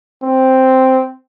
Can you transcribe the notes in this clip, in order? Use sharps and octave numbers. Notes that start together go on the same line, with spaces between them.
C4